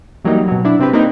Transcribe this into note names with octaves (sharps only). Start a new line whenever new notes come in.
E3 F#3 G3 A#3 D#4
B2 F#3
D4 E4
C3 C4 D4 G4 B4
A#3 C4 D#4 A#4 B4